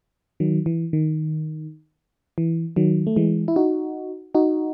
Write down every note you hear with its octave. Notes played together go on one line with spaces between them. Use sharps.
D#3 F#3
E3
D#3
E3
D#3 F#3
A3
E3 G#3
E4
D#4 F#4
D#4 F#4